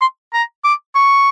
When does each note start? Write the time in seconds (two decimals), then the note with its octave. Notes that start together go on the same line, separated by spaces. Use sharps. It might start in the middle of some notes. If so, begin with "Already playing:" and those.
0.01 C6
0.33 A#5
0.64 D6
0.95 C#6